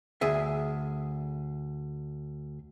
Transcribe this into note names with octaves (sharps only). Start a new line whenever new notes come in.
D2 G#4 E5